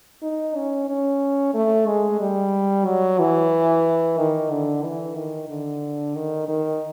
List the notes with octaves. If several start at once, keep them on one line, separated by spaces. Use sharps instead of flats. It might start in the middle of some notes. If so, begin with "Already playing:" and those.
D#4
C#4
C#4
A3
G#3
G3
F#3
E3
D#3
D3
E3
D#3
D3
D#3
D#3